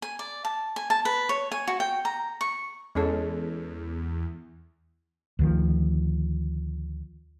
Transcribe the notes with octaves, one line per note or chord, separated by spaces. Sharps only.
G#5
D5
A5
G#5
A5
B4
C#5
G#5
F#4
G5
A#5
C#6
E2 G#3 C#4 A4
D2 D#3 F3